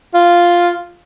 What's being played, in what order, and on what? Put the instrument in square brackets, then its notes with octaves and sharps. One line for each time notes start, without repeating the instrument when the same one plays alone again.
[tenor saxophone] F4